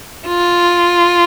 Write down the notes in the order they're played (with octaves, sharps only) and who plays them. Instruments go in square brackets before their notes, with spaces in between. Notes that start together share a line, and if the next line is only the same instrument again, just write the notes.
[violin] F4